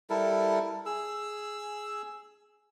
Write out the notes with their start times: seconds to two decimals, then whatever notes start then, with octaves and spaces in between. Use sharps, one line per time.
0.10 G3 E4 A4 A#4
0.86 G#4 E6